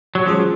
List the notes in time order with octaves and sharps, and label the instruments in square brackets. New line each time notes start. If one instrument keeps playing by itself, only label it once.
[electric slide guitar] F#3
[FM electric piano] E3 G#3 C#4 F4 G#4 [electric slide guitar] F3